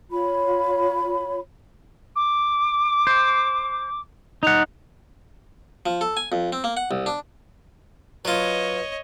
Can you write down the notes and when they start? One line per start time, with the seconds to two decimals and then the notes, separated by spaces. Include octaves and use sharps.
0.11 F4 C#5 B5
2.16 D6
3.07 C5
4.43 D#4 F#5 F7
5.86 F3
6.01 A4
6.17 G#5
6.32 F2
6.53 C4
6.64 A#3
6.77 F#5
6.91 C2
7.06 D4
8.25 F#3 F4 B4 C#5 D#5